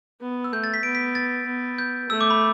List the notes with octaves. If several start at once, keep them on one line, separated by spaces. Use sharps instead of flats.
B3
E6
A3 G6
A6
B6
B3 D7
B6
A6
B3
G6
A3 E6
D6
B5